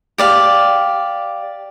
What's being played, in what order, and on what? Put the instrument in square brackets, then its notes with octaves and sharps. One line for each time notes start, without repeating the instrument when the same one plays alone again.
[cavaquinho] G4 D5 F5